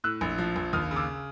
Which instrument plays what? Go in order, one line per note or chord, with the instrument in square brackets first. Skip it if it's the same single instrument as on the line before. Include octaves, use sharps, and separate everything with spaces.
[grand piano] A2 E6 F#6
A#1
F3
A#1
D#2 D#6 F6
C#3
D6 E6